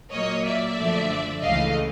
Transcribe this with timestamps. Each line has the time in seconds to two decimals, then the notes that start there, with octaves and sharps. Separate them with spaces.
0.13 A#2 F#3 A#3 C#5 D#5
0.45 D5 E5
0.77 F#2 D3 F3 A3
1.42 C#2 C#3 E3 A3 D#5 F5